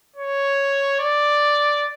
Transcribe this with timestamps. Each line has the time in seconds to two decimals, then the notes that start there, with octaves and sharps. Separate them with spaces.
0.16 C#5
1.00 D5